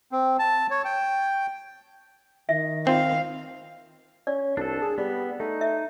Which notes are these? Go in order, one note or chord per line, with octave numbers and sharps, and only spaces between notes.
C4
A5
C#5
G5
D#3 E5
C4 F4 F5
C#4 D5
C2 D4 A4
G#4
G3 B3
A3 D#4
E5